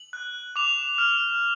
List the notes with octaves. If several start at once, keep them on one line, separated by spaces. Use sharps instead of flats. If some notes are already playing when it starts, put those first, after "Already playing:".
Already playing: F#7
F#6
D6 F7
F6